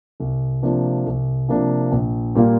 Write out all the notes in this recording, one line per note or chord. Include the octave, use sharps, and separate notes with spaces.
C2
C3 F3 A#3 D4
C2
C3 F3 A#3 D4
A#1
A#2 G3 A#3 F4